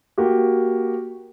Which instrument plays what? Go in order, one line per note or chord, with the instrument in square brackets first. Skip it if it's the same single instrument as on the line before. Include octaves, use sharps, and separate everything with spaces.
[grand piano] A#3 F#4 G4